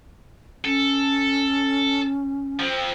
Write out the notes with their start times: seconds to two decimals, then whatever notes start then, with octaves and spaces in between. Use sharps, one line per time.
0.65 C#4 A4
2.60 F3 C4